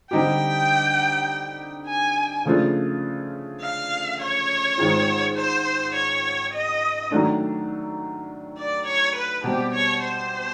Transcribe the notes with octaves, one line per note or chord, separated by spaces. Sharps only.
D3 G3 C4 D#4 G4 G5
G#5
C#3 F3 A3 D4 F4
F5
C#5
G#2 D#3 G#3 C4 F4
C5
C#5
D#5
D#3 F#3 A3 D4
D5
C#5
B4
B2 G3 C4 G4
C#5
C5